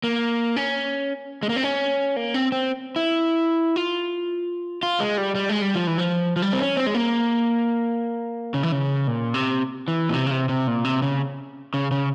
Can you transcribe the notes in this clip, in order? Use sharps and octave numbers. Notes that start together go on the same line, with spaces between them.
A#3
C#4
G#3
A#3
C4
C#4
A#3
C4
C4
E4
F4
F4
G#3
G3
G3
G#3
G3
F3
E3
F3
F3
G3
C4
C#4
C4
G#3
A#3
C#3
E3
C#3
A#2
C3
E3
A#2
C3
C#3
C3
C3
A#2
C3
C#3
C#3
C#3